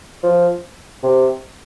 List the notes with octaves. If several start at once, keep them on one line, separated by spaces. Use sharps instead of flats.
F3
C3